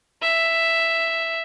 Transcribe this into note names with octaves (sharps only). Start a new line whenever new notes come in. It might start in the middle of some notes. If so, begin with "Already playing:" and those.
E5